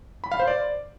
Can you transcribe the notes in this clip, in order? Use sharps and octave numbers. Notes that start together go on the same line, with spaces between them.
B5
F5
C5
D5